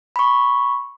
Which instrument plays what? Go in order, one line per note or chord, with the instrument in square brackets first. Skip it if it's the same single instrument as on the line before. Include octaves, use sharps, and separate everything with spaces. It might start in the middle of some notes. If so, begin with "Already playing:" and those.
[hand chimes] B5 C#6